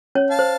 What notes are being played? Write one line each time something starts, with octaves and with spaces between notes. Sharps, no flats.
C#4 C#5
F5 A5
C5